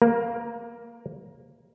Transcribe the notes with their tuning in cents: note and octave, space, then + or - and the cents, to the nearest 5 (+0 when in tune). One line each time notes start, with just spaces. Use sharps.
A#3 +0 A#4 +25